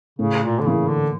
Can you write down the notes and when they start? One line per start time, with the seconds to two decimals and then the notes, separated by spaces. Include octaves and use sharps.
0.19 A2 C#3
0.43 A#2
0.60 D3
0.66 C#3 E3 A#3 E4
0.89 D3